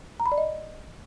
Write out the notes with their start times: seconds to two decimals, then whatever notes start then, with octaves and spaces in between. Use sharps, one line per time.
0.20 A#5
0.26 B5
0.32 D5
0.38 D#5